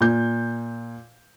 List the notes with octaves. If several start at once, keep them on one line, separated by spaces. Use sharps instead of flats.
A#2 G6